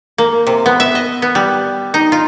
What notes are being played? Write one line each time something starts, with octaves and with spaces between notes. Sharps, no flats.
A#3
C3
B3
E5
D#5
B3
G3
D#4
F4